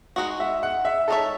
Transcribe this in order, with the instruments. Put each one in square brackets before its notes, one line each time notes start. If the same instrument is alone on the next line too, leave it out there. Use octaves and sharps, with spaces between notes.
[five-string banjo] G#3 D#4 F#4 [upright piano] F#5
[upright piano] E5
F#5
E5
[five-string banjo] G#3 D#4 F#4 C#5 E5 [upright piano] A4